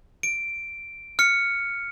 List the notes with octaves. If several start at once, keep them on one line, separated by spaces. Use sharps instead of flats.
D7
F6 C#7